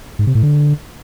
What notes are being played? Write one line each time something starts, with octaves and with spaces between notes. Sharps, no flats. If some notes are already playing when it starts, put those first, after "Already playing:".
G#2
C3
A2
D3